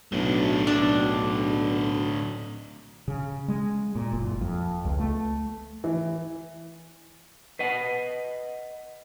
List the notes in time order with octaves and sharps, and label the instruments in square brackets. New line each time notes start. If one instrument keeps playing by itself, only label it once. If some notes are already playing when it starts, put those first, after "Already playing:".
[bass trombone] B1 [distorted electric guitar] A2 D3
[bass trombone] B1 [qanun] D4
[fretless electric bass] C#3
G#3
A#2
F#1
F2
C#2
A3
[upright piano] E3
[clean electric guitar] B4 D#5 F#5